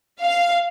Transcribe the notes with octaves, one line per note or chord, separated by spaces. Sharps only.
F5